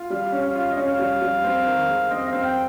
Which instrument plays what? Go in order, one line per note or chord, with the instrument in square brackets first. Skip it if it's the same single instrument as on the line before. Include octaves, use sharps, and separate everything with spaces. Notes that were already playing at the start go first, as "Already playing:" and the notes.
Already playing: [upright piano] F4
[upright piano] G3 [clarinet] F5
[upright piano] C#4
[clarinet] F5
[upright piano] F4
[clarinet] D#5
[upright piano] C#4 [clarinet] F5
[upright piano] G3
G3
C4
D#3
G#3
[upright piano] C4 [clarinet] D#5
[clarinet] F5
[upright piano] C4
[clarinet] G5